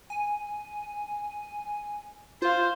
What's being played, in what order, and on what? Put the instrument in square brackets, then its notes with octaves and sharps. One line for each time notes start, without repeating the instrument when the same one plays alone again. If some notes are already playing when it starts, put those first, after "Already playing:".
[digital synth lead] G#5
[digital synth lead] F4 [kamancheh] C5 F5